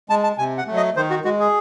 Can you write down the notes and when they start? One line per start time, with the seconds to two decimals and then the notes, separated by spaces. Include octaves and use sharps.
0.09 G#3 A5
0.23 A5
0.38 C3 G#5
0.58 F#5
0.67 F#3 A3
0.76 D#5
0.96 D#3 C5
1.10 F#4
1.25 G#3 F#4
1.39 G#4